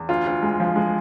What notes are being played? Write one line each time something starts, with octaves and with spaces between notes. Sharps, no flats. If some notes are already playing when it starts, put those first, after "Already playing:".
Already playing: E2
D2 F4
D2
G#3
F3
G#3